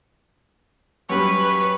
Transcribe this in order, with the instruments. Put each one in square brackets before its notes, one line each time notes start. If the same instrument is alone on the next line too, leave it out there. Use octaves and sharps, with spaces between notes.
[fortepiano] F#2 G3 [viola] B4 [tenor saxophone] C#5